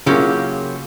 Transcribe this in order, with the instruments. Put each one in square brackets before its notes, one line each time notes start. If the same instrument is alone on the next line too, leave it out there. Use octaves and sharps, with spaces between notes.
[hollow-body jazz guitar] C#3 A#3 [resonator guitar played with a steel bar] F#3 C#4 G4 [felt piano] E4 F4 G#4